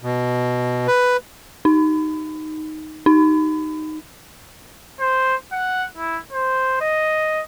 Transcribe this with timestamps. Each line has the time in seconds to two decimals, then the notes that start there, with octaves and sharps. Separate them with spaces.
0.02 B2
0.87 B4
1.65 D#4
3.06 D#4
5.00 C5
5.53 F#5
5.97 E4
6.32 C5
6.81 D#5